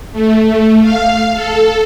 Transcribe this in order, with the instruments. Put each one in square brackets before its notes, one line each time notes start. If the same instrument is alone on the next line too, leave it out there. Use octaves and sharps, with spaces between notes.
[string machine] A3
F5
A4